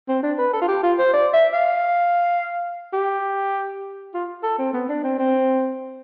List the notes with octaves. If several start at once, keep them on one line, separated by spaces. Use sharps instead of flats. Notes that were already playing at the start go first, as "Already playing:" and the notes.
C4
D4
B4
A4
F4
G4
F4
C5
D5
E5
F5
G4
F4
A4
C4
B3
D4
C4
C4